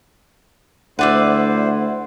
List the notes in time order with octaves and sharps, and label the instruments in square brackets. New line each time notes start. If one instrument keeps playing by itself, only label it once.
[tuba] D2 [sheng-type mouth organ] E4 C5 [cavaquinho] B4 D5 E5 [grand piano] F#5